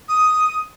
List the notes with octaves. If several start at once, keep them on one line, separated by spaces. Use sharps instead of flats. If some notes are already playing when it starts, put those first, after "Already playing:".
D#6